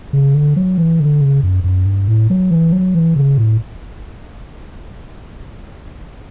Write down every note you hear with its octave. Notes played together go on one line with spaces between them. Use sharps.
C#3
D3
F#3
E3
D3
C#3
F#2
F#2
G2
A2
F#3
E3
F#3
E3
C#3
A2